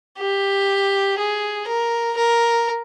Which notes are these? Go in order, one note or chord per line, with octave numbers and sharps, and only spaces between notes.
G4
G#4
A#4
A#4